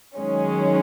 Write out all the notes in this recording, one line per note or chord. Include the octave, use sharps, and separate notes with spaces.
F#2 D#3 G#3 C#4